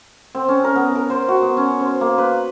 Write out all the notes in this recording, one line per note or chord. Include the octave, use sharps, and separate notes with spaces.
C4
C#4
A#4
B3
A#4
C5
F#4
B3
C#4
C5
A#3
B4